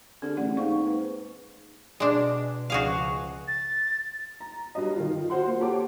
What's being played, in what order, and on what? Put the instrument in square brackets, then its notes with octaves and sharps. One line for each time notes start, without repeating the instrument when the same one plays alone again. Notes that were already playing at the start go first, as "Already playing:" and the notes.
[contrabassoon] D3 [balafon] C4 G4 G#4
[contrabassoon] A1 [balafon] D5 F#5
[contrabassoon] G#2 [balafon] A#3 F5 C#6
[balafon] B4
[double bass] B2 [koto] G#3 D4
[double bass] C#2 F3 [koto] F#4 G#4 F5
[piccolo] A6
[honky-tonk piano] A#5
G2 F#3 D#5
D#3 F4
F4 F#4 C5 F#5 C6
A#3
G4 A4 C#5 F#5 A5 D6